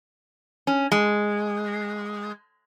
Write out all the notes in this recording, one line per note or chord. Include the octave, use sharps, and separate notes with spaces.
C#4
G#3